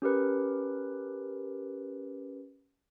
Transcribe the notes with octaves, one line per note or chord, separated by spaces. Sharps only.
C#4 G4 A#4 B4